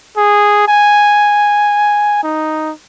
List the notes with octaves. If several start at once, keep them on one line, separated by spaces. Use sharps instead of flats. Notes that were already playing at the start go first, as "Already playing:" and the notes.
G#4
G#5
D#4